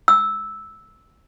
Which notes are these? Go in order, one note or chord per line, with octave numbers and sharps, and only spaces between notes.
E6